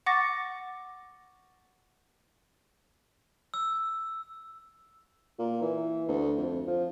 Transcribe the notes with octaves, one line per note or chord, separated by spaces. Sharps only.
F#5 C#6 D6 A6 A#6
E6
A#2
E3
D2
F2
F3